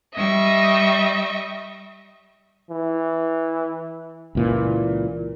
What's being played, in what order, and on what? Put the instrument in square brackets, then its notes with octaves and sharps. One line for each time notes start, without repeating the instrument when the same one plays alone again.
[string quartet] G3 D#5 E5 C#6
[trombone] E3
[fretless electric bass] C#2 A#2 E3